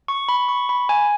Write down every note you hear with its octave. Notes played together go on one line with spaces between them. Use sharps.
C#6
B5
C#6
B5
G#5